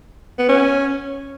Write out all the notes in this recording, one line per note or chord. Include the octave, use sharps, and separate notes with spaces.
B3
C#4